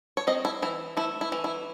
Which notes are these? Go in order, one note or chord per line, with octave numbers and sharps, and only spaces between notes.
C#5
C4 D#5
E4
E3 E4
A3 E4
E4
E3
E4